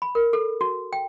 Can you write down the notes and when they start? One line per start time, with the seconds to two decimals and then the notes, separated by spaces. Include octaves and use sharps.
0.02 B5
0.15 A#4
0.33 A4
0.61 F#4
0.93 G5